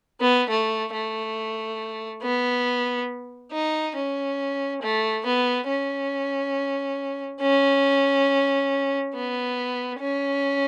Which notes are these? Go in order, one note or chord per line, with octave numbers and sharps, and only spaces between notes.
B3
A3
A3
B3
D#4
C#4
A3
B3
C#4
C#4
B3
C#4